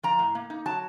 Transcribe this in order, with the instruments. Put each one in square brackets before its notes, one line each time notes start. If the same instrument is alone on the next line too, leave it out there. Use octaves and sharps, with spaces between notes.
[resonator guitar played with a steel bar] F3 A#5
A2
A#3
D#4
F#3 A5